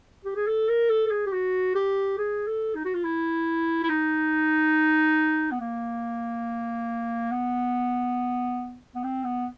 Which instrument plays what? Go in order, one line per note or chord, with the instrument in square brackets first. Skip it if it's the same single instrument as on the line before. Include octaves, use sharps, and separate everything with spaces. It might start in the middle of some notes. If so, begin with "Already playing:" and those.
[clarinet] G4
G#4
A4
A#4
A4
A4
G#4
G4
F#4
G4
G#4
A4
D#4
F#4
F4
E4
E4
D#4
B3
A#3
B3
B3
C4
B3